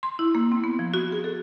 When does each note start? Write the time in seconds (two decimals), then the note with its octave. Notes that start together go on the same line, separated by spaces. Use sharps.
0.03 C6
0.19 E4
0.35 A#3
0.52 C4
0.64 B3
0.79 F3
0.94 F#4
1.12 G#4
1.24 A4